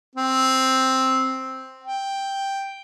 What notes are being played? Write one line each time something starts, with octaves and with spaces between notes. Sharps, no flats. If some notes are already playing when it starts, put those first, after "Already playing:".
C4
G5